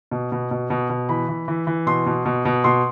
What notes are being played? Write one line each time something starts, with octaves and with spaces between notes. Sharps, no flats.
B2
B2
B2
B2
B2
E3 B5
E3
E3
E3
B2 C6
B2
B2
B2
B2 C6